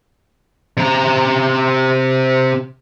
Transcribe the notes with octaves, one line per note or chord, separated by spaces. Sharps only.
C3 A#5